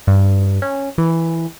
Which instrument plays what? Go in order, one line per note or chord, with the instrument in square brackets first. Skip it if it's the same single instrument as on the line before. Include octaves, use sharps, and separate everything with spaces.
[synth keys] G2
C#4
E3